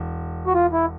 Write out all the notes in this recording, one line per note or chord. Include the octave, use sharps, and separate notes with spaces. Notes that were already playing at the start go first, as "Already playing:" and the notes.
Already playing: E1
F#4
F4
E4